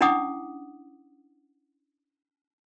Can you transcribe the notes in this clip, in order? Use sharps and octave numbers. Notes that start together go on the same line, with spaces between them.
C#4 D4 E4 F#5 D6 D#6